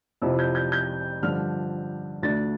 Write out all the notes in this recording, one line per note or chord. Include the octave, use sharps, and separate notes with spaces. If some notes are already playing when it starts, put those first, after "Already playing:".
F2 C3 F3 C4 E4 E6
G6
G6
G6
G2 D3 F3 F6
D2 D3 A3 D4 A6